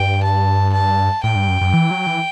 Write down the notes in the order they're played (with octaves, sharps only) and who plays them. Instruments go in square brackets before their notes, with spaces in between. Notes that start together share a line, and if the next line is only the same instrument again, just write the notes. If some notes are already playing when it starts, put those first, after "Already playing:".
Already playing: [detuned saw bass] G2 [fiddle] G5
[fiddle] A5
A5
[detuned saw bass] A2 [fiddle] G5
[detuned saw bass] G2
F#2
F#2
E3
F#3
E3